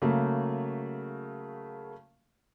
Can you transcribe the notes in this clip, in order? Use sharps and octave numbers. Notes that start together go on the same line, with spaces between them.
C#3 F#3 A3 A#3